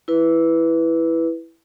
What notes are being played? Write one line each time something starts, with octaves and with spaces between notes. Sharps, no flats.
E4 B4